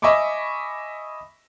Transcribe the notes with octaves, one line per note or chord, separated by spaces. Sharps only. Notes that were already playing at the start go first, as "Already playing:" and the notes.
D#5 E5 G#5 B5 C#6 D6